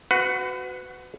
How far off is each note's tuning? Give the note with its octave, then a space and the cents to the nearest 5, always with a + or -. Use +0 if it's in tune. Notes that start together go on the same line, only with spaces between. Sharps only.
F#4 +0 B4 +30 F#5 +0